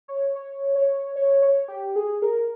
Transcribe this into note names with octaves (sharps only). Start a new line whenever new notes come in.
C#5
C#5
C#5
C#5
C#5
G4
G#4
A#4